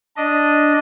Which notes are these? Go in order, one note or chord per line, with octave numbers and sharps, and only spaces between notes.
D4 D#5